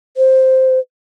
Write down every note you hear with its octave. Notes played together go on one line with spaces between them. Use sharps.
C5